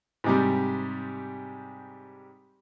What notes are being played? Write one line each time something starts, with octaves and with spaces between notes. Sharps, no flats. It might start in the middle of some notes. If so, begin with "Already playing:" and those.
G#2 C3 G3